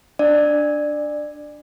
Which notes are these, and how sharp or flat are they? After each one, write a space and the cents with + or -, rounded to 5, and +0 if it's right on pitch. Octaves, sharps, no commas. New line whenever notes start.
D4 +0 D5 +20